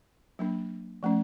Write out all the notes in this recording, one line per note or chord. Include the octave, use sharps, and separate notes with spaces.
F#3 A#3 D4
F3 A3 C#4